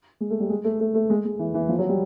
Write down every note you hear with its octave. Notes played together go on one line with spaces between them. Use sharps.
G#3
A3
G3
G#3
A3
A3
A3
G#3
G#3
E3
E3
F3
F#3
G3